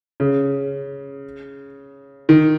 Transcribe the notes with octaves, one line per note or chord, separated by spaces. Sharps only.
C#3
D#3